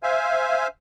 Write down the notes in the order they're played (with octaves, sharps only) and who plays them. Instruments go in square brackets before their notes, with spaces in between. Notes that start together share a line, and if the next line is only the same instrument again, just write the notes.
[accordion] C5 E5 F5 G#5